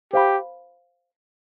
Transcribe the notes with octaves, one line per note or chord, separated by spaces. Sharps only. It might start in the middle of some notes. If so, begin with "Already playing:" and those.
G4 C5 F5 B5